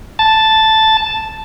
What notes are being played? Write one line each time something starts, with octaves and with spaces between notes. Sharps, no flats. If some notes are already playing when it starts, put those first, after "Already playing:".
A5